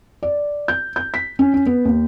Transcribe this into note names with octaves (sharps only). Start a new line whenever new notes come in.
D5
G6
G6
B6
C#4
C#4
B3
D#2